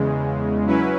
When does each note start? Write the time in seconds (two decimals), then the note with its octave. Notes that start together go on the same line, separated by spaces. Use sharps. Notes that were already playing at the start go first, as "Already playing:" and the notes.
Already playing: E2 C#3 G#3
0.66 F#3 C#4 E4 B4